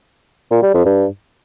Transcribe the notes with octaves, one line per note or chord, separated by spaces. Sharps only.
A#2
G3
F2
G2